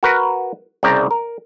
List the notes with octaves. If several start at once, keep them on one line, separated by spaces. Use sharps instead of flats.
F#4 A#4 B4
C2 C#3 D5 G5 A#5
A#4